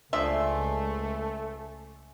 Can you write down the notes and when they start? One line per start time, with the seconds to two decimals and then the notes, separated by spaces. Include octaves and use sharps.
0.13 C#2 F3 A3 D4 D5 E5 G#5 C6